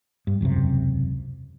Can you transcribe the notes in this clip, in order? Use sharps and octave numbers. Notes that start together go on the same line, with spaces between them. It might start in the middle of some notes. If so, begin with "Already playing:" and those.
G2
E1 C#2 F#2 C3